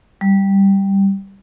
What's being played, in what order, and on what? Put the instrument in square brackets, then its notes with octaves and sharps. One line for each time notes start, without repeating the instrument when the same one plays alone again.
[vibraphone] G3